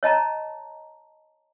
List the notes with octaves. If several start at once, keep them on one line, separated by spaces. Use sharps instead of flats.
C#5 D#5 A5 A#5